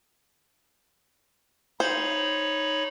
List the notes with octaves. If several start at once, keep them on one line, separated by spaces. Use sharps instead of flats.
D#4 C5 C#5 B5